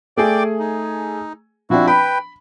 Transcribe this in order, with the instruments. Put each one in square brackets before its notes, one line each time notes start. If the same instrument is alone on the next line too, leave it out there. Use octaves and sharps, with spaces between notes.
[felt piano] A3 G#4 G#5 [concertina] D5 G5 D6
[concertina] D#4
[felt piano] F3 C4 D4 [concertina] E4 F#4
[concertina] B4 G5 [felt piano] B5